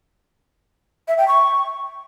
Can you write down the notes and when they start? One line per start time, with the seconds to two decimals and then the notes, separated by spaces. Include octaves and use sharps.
1.08 E5
1.18 G5
1.28 C#6